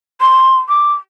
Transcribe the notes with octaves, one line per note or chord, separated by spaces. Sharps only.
C6
D6